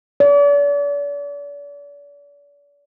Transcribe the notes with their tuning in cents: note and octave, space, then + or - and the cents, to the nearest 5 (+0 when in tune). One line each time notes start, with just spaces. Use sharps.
D5 -40